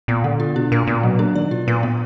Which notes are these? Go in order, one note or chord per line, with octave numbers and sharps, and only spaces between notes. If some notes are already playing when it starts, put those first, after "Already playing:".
A#2 B3
D3 B3
F4
B2 D4
A#2 A#4
A#2 B3
B2 F#3
A#3 D4
D#3 D5
B2 F4
A#2 B4
B3